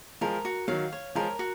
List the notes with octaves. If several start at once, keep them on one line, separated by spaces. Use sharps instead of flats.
F3 G#3 A#4
F#4
D#3 F#3 F5
C#5
F3 G#3 A#4
F#4